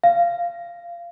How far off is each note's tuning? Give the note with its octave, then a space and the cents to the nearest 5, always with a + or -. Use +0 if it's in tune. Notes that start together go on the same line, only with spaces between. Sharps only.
F5 -20